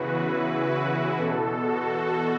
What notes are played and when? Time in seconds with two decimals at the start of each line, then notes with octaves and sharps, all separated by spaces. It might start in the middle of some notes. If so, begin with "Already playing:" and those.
Already playing: E2 C#3 E3 F#4 B4
0.24 E4
0.72 F#4
1.19 E2 B2 A4
1.66 F#4